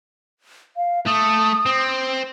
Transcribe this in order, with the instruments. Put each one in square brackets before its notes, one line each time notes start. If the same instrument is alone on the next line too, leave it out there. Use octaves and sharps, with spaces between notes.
[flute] F5
[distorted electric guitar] A3 [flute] D#6
[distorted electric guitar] C4